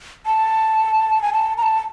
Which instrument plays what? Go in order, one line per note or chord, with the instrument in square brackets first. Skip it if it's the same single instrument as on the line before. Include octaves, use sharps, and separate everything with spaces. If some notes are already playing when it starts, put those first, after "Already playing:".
[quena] A5
G#5
A5
A#5
A5